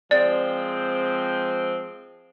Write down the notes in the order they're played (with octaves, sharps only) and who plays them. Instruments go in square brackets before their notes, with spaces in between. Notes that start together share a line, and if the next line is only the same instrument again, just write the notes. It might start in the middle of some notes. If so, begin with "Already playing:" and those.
[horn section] F3 G#3 C4 [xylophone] D5